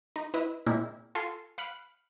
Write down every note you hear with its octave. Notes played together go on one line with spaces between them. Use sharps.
D#4
E4 B4 D#5
A#2 G#3 A#3 C4 E4
F4 A4 G#5 C6
F5 B5 F#6 C#7